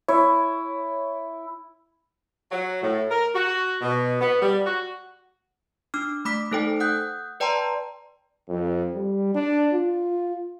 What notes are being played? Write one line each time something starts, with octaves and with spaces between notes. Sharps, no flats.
E4 C#5
F#3
A2
A#4
F#4
B2
B3
G3
F#4
D4 D6 F6
A3 B5 D6 B6
A3 D#4 A4 C5 G5
F#5 D#6 F#6 G6
B4 D5 G5 A5 A#5 C6
F2
G3
D4
F4